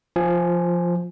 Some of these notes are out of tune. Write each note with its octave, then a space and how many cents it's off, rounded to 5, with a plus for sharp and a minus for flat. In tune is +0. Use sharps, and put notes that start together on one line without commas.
F3 +0 G#5 +0